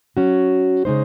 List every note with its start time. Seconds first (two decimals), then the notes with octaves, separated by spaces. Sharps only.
0.17 F#3 C#4 F#4
0.85 C#3 G#3 D#4 G#4 C5